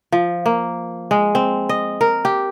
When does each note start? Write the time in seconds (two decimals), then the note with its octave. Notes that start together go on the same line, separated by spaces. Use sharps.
0.12 F3
0.46 A#3
1.11 G#3
1.35 C4
1.69 D#5
2.01 A#4
2.25 G4